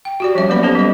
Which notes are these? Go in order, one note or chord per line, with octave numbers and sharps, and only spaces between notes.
G5
F#4 G4 D5
F3 G3 C#4 E5
F#3 A#3 B3 B4 D5 B5
C#4 D#4 G4 A4 C5
G3 D#5